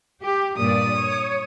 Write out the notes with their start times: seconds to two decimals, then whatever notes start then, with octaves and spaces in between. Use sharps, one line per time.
0.23 G4
0.57 G2 A#2 D5 D#6
0.94 C#5